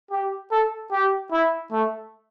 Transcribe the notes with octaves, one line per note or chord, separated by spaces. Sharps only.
G4
A4
G4
E4
A3